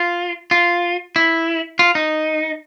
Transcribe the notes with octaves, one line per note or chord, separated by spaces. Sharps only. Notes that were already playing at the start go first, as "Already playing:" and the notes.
Already playing: F4
F4
E4
F4
D#4